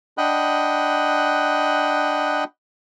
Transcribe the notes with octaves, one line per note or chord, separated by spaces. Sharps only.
D4 D#5 F#5 G5 B5 F#6